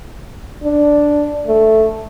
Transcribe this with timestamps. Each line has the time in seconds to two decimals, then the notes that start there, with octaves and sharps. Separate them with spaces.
0.63 D4
1.47 A3